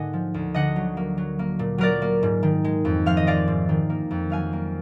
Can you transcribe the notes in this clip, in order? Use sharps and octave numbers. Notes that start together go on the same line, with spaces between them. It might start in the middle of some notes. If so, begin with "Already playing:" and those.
Already playing: G#2 D3 A#3 D#5 F#5 G#5
F3
D2
D3 D#5 F#5
F#3
A#3
F#3
A#3
A#2
F#3 A#4 D5
A#3
G#2
D#3
G#3
F2
F3 F5
D#5
G#3 D5 F5
G#2
D#3
A#3
F2
F#3 F5 G#5
A#3